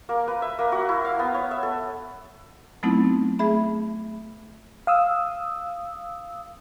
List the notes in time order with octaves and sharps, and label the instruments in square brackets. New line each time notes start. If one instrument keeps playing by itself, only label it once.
[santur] A#3
B4
E5
A#3
F#4
E4
F5
B3
C#5
E5
A4
[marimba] F#3 A3 B3 C4 D#4 E4
A3 G#4 E5 B5
[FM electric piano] F5 D#6 E6